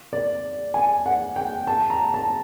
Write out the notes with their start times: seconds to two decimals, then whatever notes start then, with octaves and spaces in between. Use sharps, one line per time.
0.13 D5
0.74 G#5
1.06 F#5
1.36 G5
1.67 A5
1.90 A#5
2.14 A5